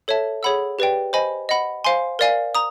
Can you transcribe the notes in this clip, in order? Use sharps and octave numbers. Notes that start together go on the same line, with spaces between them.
A4 C#5 E5 A5
G#4 C#5 F#5 B5 E6
G4 B4 D5 G5
C5 D#5 G#5 B5
D#5 F#5 B5
C5 F5 G#5 C6
A#4 D5 F5 G#5
A#5 D#6